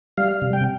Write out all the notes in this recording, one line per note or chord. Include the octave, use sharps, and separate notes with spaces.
G3 F5
C3
G5